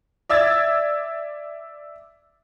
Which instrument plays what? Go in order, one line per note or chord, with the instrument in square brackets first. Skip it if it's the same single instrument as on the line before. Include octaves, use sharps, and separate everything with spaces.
[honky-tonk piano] D5 E5 E6 G#6 A6